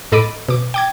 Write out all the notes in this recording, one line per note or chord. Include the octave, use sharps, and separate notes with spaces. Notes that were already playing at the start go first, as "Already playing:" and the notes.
A2 A4 D#5 B5 D6 D7
B2 D6
G5 D6 G#6